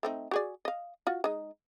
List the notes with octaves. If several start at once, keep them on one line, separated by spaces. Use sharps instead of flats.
A3 C4 D#4
F#4 G#4 D5
D#5 F5
F4 F#4
G#3 D#4